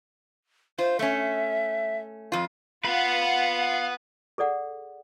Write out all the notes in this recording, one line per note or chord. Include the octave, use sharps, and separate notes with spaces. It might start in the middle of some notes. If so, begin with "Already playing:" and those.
F4 C5
A3 C#4 E5
F2 F4
B3 F4 B4 F5 F#5
G#4 A4 D5 F#5